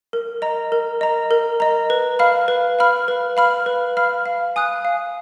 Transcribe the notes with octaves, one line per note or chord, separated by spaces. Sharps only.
A#4
D#5 A#5
A#4
D#5 A#5
A#4
D#5 A#5
B4
F5 B5 F6
B4
F5 B5 F6
B4
F5 B5 F6
B4
F5 B5 F6
F5
G#5 D#6 F#6
F5